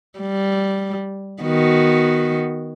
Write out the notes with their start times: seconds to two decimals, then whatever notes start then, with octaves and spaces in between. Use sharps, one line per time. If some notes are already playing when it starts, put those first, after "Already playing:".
0.19 G3
1.43 D#3 B3 F#4